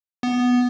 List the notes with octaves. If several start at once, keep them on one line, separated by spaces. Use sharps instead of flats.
B3